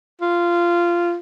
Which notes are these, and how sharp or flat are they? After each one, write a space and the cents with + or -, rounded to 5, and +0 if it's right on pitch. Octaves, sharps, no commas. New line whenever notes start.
F4 -15